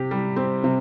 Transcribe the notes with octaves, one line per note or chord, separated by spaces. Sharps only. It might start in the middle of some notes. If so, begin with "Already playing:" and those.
Already playing: C3 G4
G3
C4
C3